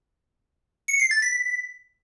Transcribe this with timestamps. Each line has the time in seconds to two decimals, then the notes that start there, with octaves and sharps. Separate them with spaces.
0.88 C#7
1.00 C7
1.11 A6
1.22 B6